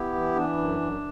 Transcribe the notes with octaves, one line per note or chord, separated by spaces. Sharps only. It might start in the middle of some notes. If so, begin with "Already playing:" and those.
Already playing: B3 E4 G4
E3
E3 D4
F#2
F#2